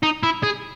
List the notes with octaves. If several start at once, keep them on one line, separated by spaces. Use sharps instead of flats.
D#4
E4
G#4